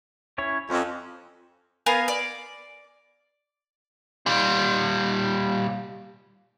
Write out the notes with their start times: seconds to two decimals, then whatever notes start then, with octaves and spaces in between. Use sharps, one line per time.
0.38 C#4 E4 C#5
0.70 F2 C#4
1.86 B3 A#4 F5 G#5
2.08 D5
4.26 A#2 G3